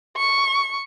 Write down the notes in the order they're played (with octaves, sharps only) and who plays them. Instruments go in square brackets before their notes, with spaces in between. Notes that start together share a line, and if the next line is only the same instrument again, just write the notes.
[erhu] C#6